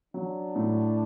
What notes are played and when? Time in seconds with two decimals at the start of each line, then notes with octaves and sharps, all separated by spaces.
0.14 F#3 D4
0.56 A2